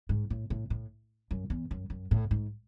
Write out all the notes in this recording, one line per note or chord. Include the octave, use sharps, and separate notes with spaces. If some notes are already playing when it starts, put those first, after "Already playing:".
G#2
A2
A2
A2
F#2
E2
F#2
F#2
A2
G#2